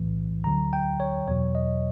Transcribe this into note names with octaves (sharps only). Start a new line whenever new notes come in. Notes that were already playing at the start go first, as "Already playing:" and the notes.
Already playing: B1 A2 E3
D2 D3 F#3 A#5
G5
C#5
E2 B2 F#3 C#5
D#5